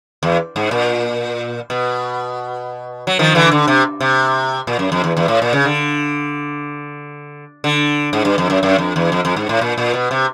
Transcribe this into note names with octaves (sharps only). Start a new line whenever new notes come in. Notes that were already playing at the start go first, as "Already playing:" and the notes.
E2
G#2
A#2
B2
F#3
D#3 F3
D3 E3
D3
C3
C3
A#2
F#2
F2
E2
E2
A2
A#2
C#3
D3
D3
G#2
G2
F2
F#2
F#2
F2
E2
F2
F2
G#2
A2
A#2
A#2
B2
C3